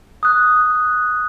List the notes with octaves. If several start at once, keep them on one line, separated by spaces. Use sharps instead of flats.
D#6 F#6